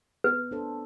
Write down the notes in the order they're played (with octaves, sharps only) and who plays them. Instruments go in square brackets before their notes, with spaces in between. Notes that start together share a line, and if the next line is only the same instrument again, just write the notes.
[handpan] B3 [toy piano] B4
[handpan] D4 A4 C5